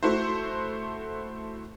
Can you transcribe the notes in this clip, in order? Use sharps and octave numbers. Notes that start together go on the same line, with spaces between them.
A3 E4 F#4 C5